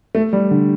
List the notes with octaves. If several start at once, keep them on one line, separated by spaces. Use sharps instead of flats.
A3
G3
D3